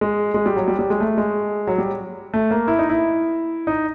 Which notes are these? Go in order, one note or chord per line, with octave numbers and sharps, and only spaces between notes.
G#3
G#3
G3
F#3
G3
G3
G#3
A3
G#3
F#3
G3
A3
A#3
E4
D#4
E4
D#4